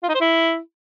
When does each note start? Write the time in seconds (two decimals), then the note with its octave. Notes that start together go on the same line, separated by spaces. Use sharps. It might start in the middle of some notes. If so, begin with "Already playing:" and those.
0.03 F4
0.09 D#4
0.15 C5
0.21 E4